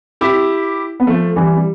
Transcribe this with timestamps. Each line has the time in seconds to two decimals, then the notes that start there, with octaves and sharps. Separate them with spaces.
0.21 E4 G4
1.00 B3
1.07 F3 A3
1.36 E3 G3
1.56 G3